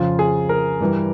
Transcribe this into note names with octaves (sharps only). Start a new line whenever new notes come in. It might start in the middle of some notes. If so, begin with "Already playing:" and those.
Already playing: F2 C#3 F3 F4
G#4
A#4
G2 E3 G3